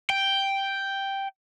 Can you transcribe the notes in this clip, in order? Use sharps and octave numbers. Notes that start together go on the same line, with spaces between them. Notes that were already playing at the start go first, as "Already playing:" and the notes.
G5